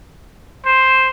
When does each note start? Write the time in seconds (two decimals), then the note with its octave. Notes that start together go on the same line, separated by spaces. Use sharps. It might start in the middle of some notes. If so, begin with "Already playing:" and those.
0.65 C5